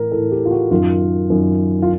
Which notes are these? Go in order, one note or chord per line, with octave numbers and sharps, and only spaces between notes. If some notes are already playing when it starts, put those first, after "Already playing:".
Already playing: A2 E3 A#4
A2 E3 A4
G4
F4
F#4
F#2 D#3 F4
F#2 D#3
F4